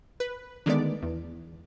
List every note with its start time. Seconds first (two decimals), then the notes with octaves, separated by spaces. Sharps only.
0.20 B4
0.66 D3 D#3 G#3 A3 B3 D5
1.02 E2